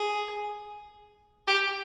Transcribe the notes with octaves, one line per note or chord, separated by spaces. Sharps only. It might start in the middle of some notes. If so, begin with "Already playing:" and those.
Already playing: G#4
G4